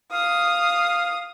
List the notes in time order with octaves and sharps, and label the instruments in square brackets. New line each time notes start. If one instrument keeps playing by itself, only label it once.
[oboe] F5 [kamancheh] D#6